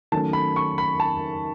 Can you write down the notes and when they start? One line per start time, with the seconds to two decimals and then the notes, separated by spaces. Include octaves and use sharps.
0.12 D#3 F#3 A3 C#4 A5
0.33 B5
0.56 C#6
0.78 B5
1.00 A5